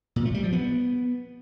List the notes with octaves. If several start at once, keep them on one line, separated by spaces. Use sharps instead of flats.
A#2
A3
G3
F3
B3